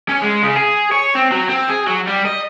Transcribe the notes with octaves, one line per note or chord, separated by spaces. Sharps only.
C#4
G#3
C#3
G#4
C#5
C4
F#3
C4
G#4
F#3
G3
D#5